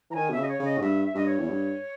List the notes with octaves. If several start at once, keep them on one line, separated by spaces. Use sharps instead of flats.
E3 A#5
D#3 G#5
B2 E5
C#3 D#5
C#5
C#3
D#5
G#2
G2 E5
E5
G2 D#5
C#5
E2
G2